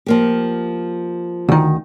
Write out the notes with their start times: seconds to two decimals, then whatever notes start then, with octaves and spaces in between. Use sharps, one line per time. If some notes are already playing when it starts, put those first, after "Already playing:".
0.06 F3 A#3 G4
1.49 D2 D#3